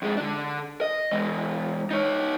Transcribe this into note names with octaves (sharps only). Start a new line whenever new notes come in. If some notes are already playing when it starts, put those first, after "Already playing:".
F2 G#3
D3 D4
D#5
E3 G#3
D#4 C#5